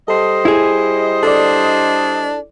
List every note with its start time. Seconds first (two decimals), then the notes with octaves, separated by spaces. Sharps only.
0.08 G3 A4 C5 D#5
0.45 E4 G#4
1.23 D4 A4 D5